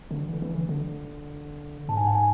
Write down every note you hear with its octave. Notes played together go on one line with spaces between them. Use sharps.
D3
E3
E3
D3
D3
G#2 A5
G#5
F#5
G#5